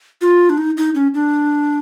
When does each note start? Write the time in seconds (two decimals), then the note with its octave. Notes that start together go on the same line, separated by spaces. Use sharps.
0.21 F4
0.50 D4
0.58 D#4
0.77 D#4
0.95 C#4
1.14 D4